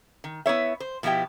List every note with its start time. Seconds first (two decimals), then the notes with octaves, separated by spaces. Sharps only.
0.24 D#3
0.46 B3 E4 C#5 E5
0.80 C5
1.03 B2 F3 B3 E4 G4 G5